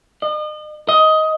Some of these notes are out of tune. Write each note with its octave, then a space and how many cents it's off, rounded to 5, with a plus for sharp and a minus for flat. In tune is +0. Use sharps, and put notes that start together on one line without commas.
D#5 -40
D#5 +15